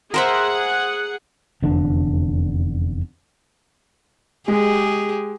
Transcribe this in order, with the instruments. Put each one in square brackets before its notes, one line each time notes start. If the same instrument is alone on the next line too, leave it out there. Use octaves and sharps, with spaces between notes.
[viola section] G#4 F#5 [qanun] A#4 C5 E5
[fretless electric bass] F1 E2 D3 D4
[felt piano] G#3 [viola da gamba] G4 G#4